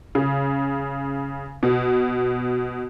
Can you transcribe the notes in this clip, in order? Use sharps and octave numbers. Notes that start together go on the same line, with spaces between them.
C#3
B2